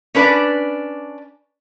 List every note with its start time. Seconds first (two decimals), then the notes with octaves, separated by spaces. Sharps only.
0.15 C#4 D4 B4 C#5 D5